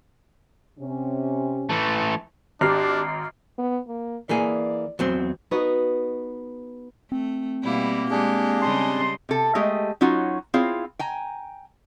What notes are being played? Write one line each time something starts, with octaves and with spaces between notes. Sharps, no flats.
C3 C#4
E3 A3
G#1 D4 G4 A#5 F6 C7
B3
A#3
E3 A#3 G#4 D5
E2 F#3 C4
B3 D#4 F#4
A3 C4
B2 G3 A#3 E4
G#3 D4 G4 G#4
C#3 G3 D#5 A5 C6
C3 A4
G#3 A3 G4 D#5
F#3 C#4 D#4 F4 F#4
C4 E4 F4 G#4 C#5 F5
G5 G#5 A#5